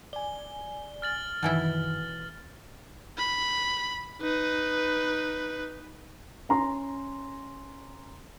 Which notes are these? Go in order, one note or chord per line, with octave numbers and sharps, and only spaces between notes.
D5 G#5 G7
F6 A6 F#7
F#2 B2 D#3 E3 E4
B5
D#4 B4
C#4 A#5 C6